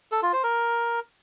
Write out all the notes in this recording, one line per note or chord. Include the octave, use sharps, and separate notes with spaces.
A4
F4
C5
A#4